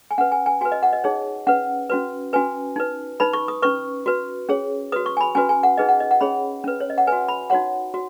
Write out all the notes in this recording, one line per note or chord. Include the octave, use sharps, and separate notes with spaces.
G#5
C#4 B4 F#5
G#5
G#5
F#4 B4 G#5
D#5
F#5
D#5
D#4 G#4 C#5
C#4 B4 F#5
C#4 F#4 B4
C#4 F#4 B4 G#5
D#4 B4
D#4 B4 B5
C#6
D#6
C#4 B4 C#6
F#4 B4
C#4 G#4 C#5
F#4 B4 D#6
C#6
G#5
B5
C#4 F#4 B4 G#5
G#5
F#5
D#4 G#4 B4 D#5
F#5
D#5
F#5
C#4 G#4 C#5 B5
C#4 B4
C#5
D#5
F#5
B4 G#5
F#4
B5
D#4 F#4 C#5 F#5
F#4